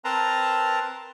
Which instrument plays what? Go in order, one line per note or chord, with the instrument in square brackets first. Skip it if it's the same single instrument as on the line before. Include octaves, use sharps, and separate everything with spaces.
[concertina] C4 A#4 B4 A5 A#5 C6